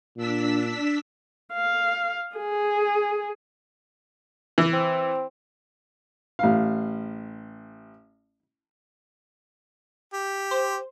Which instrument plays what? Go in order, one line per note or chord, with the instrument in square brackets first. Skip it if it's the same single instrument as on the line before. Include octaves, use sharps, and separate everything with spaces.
[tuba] A#2 [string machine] D4 E6 B6
[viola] F5
G#4
[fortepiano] E3
[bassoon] C4
[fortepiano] A1 F5
[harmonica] G4
[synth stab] C5